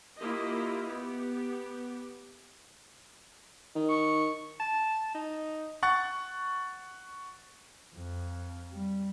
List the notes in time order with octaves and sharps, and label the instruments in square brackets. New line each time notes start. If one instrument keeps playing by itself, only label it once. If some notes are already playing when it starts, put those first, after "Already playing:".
[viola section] A#3 E4 F4 G4 D#5
B3 G4
[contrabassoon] D#3
[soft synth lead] C#6
[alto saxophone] A5
D#4
[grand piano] F#5 C#6 F#6 A6 C#7
[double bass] F2
G3